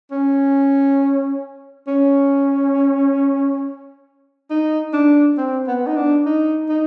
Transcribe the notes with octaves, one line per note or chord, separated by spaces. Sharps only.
C#4
C#4
D#4
D4
C4
B3
D#4
D4
D#4
D#4